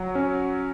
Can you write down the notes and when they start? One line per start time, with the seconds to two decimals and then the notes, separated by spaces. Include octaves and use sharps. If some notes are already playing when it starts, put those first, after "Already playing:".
Already playing: F#3
0.15 C#4